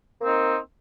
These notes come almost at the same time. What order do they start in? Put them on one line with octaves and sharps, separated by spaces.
A#3 C4 D#4